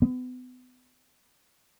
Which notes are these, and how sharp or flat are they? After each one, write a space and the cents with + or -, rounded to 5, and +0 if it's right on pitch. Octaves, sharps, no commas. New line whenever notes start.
B3 +35